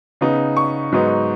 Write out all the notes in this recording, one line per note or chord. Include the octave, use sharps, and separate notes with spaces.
C#3 B3 D#4
C#6
G#2 F#3 B3 D#4